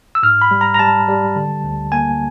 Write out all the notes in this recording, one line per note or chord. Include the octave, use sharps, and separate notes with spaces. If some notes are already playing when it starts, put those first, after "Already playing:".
E6
G#2 F6
B5
G3
A#5
A#5
G3 A5
G3
D3
D2
A#3 G#5